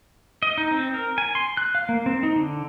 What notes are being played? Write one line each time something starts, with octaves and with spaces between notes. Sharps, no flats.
D#5
D#4
C4
A#4
G#5
C6
F#6
F5
A#3
C4
D#4
D3